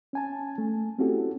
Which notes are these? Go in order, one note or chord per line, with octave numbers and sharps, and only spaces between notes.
C#4 G#5 A5
A3
C4 C#4 E4 F#4 G4 A4